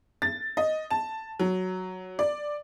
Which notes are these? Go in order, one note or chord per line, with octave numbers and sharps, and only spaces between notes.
A6
D#5
A5
F#3
D5